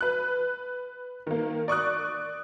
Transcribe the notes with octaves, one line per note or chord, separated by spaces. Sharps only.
B4 F#6
D#3 A#3
D5 C#6 D#6 F#6